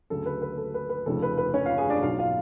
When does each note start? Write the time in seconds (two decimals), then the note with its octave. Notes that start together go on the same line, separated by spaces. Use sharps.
0.10 D2 C#3 F#3 A4
0.26 B4
0.42 B4
0.57 A4
0.74 B4
0.89 B4
1.06 F1 F2 C#3 F3 A4
1.22 B4
1.38 B4
1.54 C#4 C#5
1.66 F4 F5
1.78 G#4 G#5
1.90 D4 D5
2.02 B1 B2 F#3 F4 F5
2.19 F4 F5